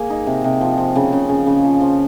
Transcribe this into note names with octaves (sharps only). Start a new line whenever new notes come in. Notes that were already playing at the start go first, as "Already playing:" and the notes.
Already playing: A#3 G#4
D#4
C3
C3
F3
F3
C#3
C#3
C#3
C#3
F3
F3